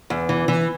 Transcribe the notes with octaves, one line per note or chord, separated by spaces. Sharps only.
E2
E3
E3